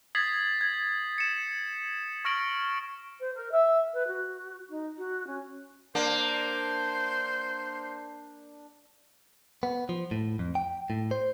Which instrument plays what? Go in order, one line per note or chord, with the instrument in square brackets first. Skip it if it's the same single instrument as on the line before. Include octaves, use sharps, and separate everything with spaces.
[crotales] D#6 G#6 A6 B6 C7 F#7
G#6
C#7 E7
C#6 F6 A#6 D7 F#7
[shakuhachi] C5
A#4
E5
B4
F#4
D#4
F#4
C#4
[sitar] A#3 [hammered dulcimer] D4 [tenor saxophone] C5
[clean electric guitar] B3
F3
A2
F2
G5
A2
C5